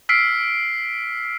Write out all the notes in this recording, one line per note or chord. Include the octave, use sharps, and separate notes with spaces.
E6 F6 B6 C7 D7